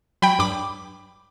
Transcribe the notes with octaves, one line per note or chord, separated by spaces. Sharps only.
F#3 G5 B5
G2 B5 D6